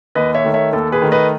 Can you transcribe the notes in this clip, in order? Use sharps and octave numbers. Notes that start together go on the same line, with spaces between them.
D#2 B4 D#5
C#5 E5
D#3 A3
C#5 E5
D#2 A4
G#4 B4
D#3 A3
B4 D#5